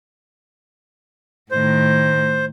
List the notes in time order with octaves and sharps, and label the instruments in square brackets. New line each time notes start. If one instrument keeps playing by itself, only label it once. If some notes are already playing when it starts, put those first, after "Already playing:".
[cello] A2 D#3 [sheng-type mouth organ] C5